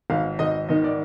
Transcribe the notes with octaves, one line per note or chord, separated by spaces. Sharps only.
G#1 F5
G#1 D#5
D#3 D#5
D5